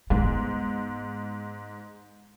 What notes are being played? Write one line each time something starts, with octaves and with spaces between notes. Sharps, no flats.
G#2 B3